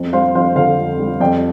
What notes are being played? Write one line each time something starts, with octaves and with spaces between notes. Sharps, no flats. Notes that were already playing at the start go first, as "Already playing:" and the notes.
Already playing: F2 C4
G3 C5 F5
F2 C5 F5
D3 C5 F5
F2
G3
F2 D5 G5